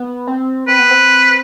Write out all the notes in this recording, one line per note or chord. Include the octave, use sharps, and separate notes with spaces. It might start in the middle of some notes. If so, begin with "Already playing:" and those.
Already playing: B3
C4
C4 B4
B3
C4